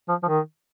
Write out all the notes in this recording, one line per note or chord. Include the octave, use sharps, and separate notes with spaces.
F3
F3
D#3